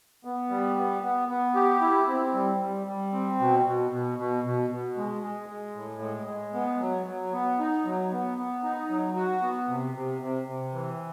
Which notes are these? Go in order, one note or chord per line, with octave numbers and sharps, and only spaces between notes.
B3
G3
B3
B3
B3
G4
E4
C4
G3
G3
G3
C4
B2
B2
B2
B2
B2
B2
G#3
G#3
G#3
A2
G#3
G#3
B3
F#3
F#3
B3
D#4
F#3
B3
B3
D#4
F#3
F#4
B3
C3
C3
C3
C3
E3